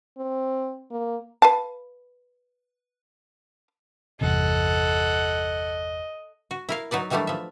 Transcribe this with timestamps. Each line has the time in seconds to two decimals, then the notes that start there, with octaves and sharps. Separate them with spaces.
0.17 C4
0.91 A#3
1.42 B4 F5 A5
4.21 G1 E2 C3 A4 D#5 F#5
6.51 F#4
6.69 E4 A#4 F5
6.91 F#3 D#4 B4 D5
7.10 D#3 E3 F#3 G3 A3 D4
7.27 F3 E5